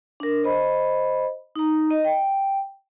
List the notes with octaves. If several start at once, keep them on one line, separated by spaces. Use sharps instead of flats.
D4 A#4
C5 D#5 B5
D#4 A#5
D#5
G5